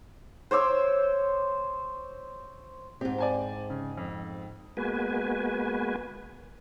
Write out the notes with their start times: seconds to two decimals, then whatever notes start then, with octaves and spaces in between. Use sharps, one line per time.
0.51 C5 C#5 D6 E6
3.01 G#2 C4 G4
3.18 D5 G#5 A5
3.70 C#3
3.98 F2
4.77 G#3 A#3 B3 F#4 B4 G#5